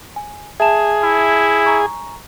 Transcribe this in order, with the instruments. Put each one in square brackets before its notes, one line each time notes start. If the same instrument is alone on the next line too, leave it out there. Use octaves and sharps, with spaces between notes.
[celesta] G#5
[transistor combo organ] G#4 [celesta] E5 A5 E7
[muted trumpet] E4
[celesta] G#5 A#5 C#6